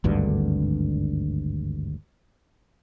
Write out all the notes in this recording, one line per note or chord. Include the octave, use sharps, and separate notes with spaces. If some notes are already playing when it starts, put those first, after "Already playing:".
G#1 D2 G2 D3